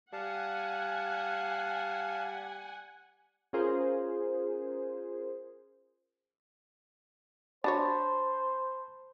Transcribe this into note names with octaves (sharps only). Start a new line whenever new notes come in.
G3 F5 F#5 G#5 A5
C#4 F4 G#4 A#4 C5
D4 F#4 C5 C#5 A5 B5 A6